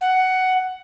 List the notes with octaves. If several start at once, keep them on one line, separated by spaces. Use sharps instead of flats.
F#5